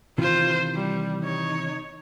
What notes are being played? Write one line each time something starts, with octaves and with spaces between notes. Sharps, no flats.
C3 D#3 E3 F4 C5
G3
D#4 C#5